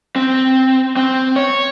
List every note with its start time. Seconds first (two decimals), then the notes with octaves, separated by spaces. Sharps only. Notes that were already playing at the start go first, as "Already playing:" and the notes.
0.16 C4
0.96 C4
1.36 C#5